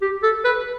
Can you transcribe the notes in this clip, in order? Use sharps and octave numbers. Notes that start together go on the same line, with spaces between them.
G4
A4
B4